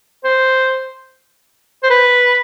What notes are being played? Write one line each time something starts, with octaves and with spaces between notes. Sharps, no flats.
C5
C5
B4